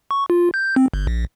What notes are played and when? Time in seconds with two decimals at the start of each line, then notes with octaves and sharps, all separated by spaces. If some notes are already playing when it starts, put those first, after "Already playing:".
0.11 C#6
0.30 F4
0.54 G6
0.76 C4
0.94 G1
1.07 A#1